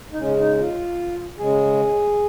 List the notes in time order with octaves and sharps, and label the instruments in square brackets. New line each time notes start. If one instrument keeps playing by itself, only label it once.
[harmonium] D#4
C#3 G#3 C#4
D#4
F4
C#3 G#3 G#4